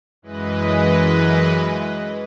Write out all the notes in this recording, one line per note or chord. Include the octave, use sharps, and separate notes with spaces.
F#2 E3 G#3 B4 D#5